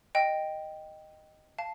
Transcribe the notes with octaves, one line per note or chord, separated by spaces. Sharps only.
D#5 G5
F5 A5